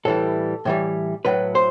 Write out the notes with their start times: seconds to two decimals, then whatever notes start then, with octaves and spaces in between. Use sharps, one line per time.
0.05 A2 E3 G3 A4
0.65 A2 E3 G3
1.25 A2 F#3 B4
1.55 C5